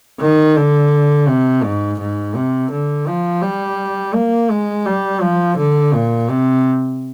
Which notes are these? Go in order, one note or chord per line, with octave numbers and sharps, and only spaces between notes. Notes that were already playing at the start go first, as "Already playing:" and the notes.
D#3
D3
C3
G#2
G#2
C3
D3
F3
G3
A#3
G#3
G3
F3
D3
A#2
C3